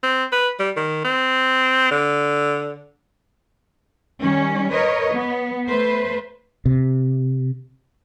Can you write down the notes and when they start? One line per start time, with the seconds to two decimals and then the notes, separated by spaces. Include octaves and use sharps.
0.03 C4
0.32 B4
0.60 G3
0.77 D#3
1.05 C4
1.91 D3
4.20 D#3 G3 C#4
4.73 A#4 B4 C#5 D#5
5.13 B3
5.68 A3 B4 C5
6.66 C3